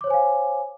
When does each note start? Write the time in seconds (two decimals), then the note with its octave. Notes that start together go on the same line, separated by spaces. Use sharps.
0.01 D6
0.04 C#5
0.07 C5
0.10 G#5
0.14 F5